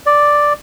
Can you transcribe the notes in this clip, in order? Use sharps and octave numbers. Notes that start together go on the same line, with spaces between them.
D5